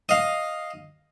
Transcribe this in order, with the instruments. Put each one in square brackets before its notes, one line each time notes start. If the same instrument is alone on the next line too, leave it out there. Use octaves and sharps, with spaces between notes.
[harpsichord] D#5 F5